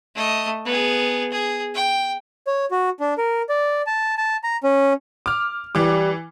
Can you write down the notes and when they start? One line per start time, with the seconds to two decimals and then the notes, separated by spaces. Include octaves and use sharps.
0.16 A3 D#5
0.66 B3 G#4
1.32 G#4
1.75 G5
2.47 C#5
2.71 F#4
3.00 D4
3.18 A#4
3.49 D5
3.87 A5
4.17 A5
4.44 A#5
4.64 C#4
5.26 D6 F6
5.75 E3 G3 D6